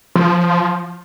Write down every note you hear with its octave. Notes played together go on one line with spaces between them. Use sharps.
F3